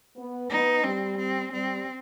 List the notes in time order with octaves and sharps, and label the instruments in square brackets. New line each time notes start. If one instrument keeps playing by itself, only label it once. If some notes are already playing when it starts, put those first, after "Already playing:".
[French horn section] B3
[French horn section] B3 [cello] D#4
[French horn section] G3 [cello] C4
[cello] C4
[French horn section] G3 [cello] C4